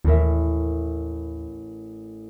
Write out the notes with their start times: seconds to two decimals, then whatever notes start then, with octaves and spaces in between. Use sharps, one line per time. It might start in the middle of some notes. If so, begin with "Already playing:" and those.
0.05 A1 D#2 A#4 E5